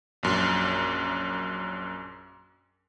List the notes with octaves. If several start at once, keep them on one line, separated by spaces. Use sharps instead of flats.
A#1 F#2